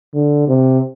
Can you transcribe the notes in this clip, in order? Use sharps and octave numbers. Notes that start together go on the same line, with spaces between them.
D3
C3